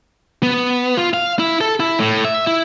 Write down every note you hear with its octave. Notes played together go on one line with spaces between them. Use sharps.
B3
F4
F5
E4
A4
E4
A2
E5
E4